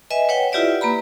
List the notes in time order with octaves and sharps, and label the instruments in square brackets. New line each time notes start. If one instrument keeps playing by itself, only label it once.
[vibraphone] B4 D#5 E5 G#5
B4 C#5 F#5 G5
E4 F4 G4 B4 D5 E5
A#3 B4 A#5 B5